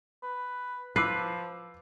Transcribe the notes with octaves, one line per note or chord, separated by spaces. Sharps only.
B4
F3 B4 D6 E6 C7